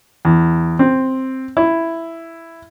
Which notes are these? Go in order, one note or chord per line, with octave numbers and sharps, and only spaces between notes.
E2
C4
E4